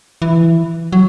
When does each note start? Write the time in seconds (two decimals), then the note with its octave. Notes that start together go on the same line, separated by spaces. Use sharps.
0.22 E3
0.92 F#3